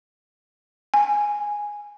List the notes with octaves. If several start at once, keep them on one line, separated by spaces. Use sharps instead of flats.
G#5